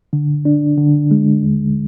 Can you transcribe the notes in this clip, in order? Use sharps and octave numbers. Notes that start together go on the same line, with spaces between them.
D3
D4
D3
G#3
D#2